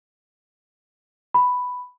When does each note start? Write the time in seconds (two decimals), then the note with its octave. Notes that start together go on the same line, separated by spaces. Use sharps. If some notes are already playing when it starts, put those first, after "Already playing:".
1.34 B5